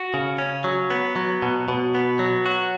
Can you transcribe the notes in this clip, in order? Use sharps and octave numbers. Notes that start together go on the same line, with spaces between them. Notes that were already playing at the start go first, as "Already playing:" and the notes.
Already playing: F#4
C#3
C#4
F#3
B3
F#3
B2
B2
B3
F#3
F#4